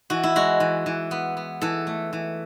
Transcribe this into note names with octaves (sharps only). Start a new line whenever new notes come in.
E3 F#4
E4
G#3 F#4
E3
E3
B3
B3
E3 A4
A3
E3